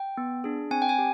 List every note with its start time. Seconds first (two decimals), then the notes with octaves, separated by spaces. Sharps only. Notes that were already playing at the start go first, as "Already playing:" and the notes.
Already playing: G5
0.17 B3
0.44 D4 G#4
0.71 C4 G#5
0.82 G5
0.89 G#5
0.98 G4